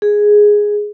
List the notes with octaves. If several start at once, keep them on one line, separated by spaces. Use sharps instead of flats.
G#4